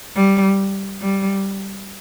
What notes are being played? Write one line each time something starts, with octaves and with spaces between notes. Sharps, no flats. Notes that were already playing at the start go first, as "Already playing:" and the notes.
G3
G3